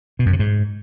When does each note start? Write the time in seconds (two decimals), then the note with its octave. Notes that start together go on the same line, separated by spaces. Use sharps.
0.19 B2
0.26 F#2
0.33 C3
0.39 G#2